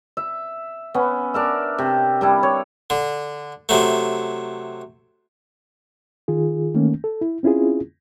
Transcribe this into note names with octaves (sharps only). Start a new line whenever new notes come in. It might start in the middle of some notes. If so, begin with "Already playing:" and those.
E5
B3 C#4
D4 A#4 E5
C3
G3 D4 E4
C#5
D3
C3 F#3 A3
D#3 F4 G#4
D#3 A3 A#3 C#4
A4
E4
C4 C#4 E4 F4 G#4